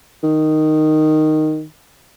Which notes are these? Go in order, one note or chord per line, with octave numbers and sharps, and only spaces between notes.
D#3